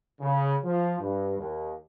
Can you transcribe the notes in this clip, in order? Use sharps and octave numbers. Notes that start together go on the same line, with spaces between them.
C#3
F3
G2
D#2